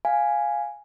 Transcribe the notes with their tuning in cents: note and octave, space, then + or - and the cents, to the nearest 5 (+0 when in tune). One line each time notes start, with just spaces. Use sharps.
F5 +0 G#5 +0